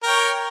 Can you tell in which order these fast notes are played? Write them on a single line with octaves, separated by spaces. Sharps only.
A#4 G5 C#5